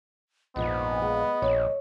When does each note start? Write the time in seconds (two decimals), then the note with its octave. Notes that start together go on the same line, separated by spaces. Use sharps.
0.56 A#1 F2 G#2 F3 B3 D#5
1.02 G#3
1.42 A#1 C#5